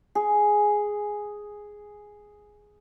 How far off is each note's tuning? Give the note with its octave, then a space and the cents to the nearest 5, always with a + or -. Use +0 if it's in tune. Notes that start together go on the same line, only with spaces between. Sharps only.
G#4 +0